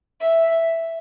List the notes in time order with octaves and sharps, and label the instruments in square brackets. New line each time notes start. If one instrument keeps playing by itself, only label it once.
[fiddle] E5